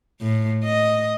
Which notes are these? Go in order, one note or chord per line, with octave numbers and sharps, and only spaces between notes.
A2
D#5